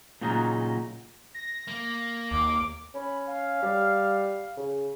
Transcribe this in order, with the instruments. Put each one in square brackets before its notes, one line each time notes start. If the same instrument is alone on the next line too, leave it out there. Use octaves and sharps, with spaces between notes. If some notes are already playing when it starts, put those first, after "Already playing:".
[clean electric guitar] A#2 C#3 F#3 D#4
[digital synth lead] A#6
[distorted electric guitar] A#3
[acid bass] D#2 [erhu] D6
[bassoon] C#4 [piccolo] B5
[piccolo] F5
[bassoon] G3
C#3